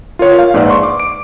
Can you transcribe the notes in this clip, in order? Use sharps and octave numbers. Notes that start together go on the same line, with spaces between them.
F4 A#4 C#5
F5
A#1 G#2 B4 D5 F#5
C6 C#6
D6
D7